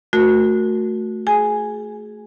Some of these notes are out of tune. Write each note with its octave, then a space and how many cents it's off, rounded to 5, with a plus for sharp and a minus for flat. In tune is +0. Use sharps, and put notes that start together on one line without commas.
A3 +0 F#4 -15 A#4 +0
G#4 +10 G#5 +0